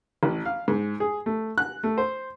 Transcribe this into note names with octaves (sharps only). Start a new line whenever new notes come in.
A1
F5
G#2
G#4
A3
F#6
A3
C5